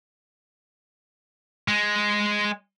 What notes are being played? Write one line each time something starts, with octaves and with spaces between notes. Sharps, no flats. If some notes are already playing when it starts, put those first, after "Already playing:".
G#3